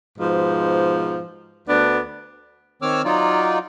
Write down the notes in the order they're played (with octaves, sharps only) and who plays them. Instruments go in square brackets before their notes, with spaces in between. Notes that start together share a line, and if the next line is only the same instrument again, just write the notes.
[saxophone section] G#2 B2 F3
D2 B3 D4
[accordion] D#3 C4 C#5 D6 E6 F6
F#3 D#4 F4 D5